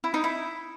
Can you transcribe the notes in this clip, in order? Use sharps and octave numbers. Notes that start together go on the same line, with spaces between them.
E4
D#4
E4